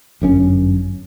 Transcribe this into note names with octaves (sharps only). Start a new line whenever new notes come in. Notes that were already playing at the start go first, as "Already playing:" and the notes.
G1 F#2 C#4